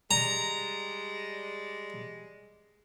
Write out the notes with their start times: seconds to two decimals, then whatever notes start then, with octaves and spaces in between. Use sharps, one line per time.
0.11 G3 G#3 D5 A#5